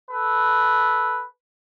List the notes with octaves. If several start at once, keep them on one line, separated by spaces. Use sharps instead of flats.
A4 B4